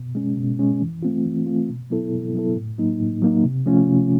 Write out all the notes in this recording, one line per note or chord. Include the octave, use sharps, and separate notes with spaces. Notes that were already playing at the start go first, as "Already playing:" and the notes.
Already playing: B2
G#3 C#4
B2
G#3 C#4
E3
A3 C4 F4
E3
A3 C4 F4
B2
F#3 B3 E4 A4
B2
F#3 B3 E4 A4
A2
F#3 A#3 D#4
A2
F#3 A#3 D#4
C3
F3 A3 C#4 F4
C3